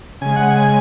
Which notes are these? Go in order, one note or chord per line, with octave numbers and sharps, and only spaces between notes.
C#3 G#3 G#5
F#5
G#5